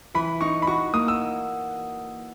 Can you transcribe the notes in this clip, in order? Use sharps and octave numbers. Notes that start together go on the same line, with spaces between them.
E3 B5
D#4 C#6
B5
F#4 C#6
A#3 D#6
E6